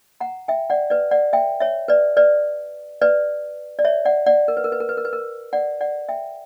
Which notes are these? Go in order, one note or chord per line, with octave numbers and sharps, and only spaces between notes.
F#5 A#5
E5 G5
D5 F#5
B4 D5
D5 F#5
E5 G5
C#5 E5
B4 D5
B4 D5
B4 D5
D5
C#5 E5
D5 F#5
D5 F#5
A#4
B4
A#4
B4
A#4
B4
A#4
B4
A#4
D5 F#5
D5 F#5
E5 G5